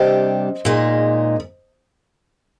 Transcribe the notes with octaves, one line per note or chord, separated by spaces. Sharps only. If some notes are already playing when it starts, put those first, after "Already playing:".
Already playing: C3 G3 D4 G4 C5 D#5
A#2 G#3 D#4